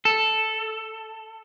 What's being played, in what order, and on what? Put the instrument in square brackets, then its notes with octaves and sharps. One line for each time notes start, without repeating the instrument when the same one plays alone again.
[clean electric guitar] A4